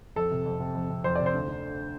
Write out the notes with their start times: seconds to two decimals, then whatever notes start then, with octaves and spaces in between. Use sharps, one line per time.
0.16 F2 A4
0.31 C3
0.45 F2
0.60 C3
0.75 F2
0.89 C3
1.04 F2 C5
1.15 C3 D5
1.26 C5
1.34 D2
1.48 D3